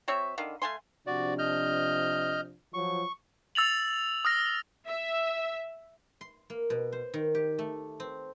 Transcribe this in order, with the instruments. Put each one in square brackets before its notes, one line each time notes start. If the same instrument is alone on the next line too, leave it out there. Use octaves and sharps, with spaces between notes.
[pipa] F#3 C4 C#5 E5
D3 D#3 F5
A3 F5 G#5 C6
[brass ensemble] C3 F3 D4 [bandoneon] F#4 D5
[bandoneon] D#5 F6 G6
[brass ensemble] F3 F#3 [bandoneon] C#6
[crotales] E6 A6 F7 F#7
D#6 F6 A#6
[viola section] E5
[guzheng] C6
A#3
B2
C5
D#3
G4
A3
C4